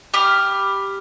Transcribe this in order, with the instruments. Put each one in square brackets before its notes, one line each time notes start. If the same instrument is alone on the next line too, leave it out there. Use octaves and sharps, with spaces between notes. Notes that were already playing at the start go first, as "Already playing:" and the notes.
[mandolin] G4 B5 F6